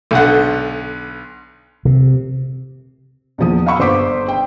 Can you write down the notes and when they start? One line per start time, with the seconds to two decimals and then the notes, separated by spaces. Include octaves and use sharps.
0.11 B1 D3 F#5
1.85 C3
3.38 E2 A#2 F3 D#6
3.66 F5 F#5 B5 C#6 E6
3.79 G1 C5 C6 D6 B6
4.28 G5